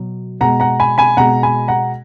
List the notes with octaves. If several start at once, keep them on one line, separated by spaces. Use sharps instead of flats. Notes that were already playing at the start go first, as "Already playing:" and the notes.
Already playing: B2 F#3
B2 G#3 F#5 A#5
F#5 A#5
G#5 B5
G#5 B5
B2 G#3 F#5 A#5
G#5 B5
F#5 A#5